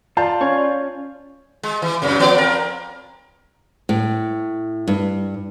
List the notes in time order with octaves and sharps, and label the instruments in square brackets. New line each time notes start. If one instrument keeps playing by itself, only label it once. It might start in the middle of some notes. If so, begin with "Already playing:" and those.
[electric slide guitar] F4 [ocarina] D5 [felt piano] A5 G6
[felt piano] C#4 [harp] C#5
[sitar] G#3
E3
F#2 A#2 C#3
F3 B3 D5
F2 A#4
[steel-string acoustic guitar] A2
G2